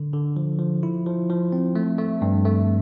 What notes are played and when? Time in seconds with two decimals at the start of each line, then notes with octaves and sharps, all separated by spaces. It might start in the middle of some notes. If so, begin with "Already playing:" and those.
Already playing: D3
0.13 D3
0.37 F3
0.59 F3
0.83 E4
1.07 F3
1.30 F3
1.52 C4
1.75 A3
1.98 A3
2.22 G2
2.45 A3